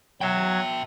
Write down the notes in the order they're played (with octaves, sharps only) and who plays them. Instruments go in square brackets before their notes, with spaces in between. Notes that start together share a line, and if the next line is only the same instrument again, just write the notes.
[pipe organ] F#3 G#6 [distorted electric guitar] E5 G5